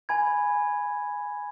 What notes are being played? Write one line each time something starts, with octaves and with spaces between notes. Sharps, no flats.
G#5 B5 G#6